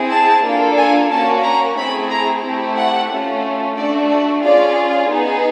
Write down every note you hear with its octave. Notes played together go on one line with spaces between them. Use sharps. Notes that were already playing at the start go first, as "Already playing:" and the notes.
Already playing: C4 E4 G#4
A5
A#3 D4 F4 A4
G#5
A#3 C#4 F#4 A5
A#5
A3 C4 E4 G#4 B5
A#5
A3 C4 E4 G4
F#5
A3 C#4 F4
A3 D4 F#4 D5
D5
C#4 F4 G#4 D5
B3 D#4 G#4